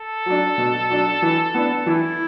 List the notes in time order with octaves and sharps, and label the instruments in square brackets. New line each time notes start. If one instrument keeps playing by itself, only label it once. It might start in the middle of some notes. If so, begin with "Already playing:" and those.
Already playing: [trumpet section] A4
[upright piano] F#3 D4
B2
F#3 D4
E3
B3 D4
[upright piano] E3 [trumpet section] E4